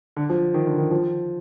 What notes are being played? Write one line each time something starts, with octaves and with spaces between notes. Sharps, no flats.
D3
F3
D#3
D3
D#3
F3